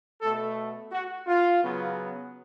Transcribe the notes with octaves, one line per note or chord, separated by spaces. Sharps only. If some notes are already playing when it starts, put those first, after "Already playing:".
B2 A3 A4
F#4
F4
C#3 F#3 B3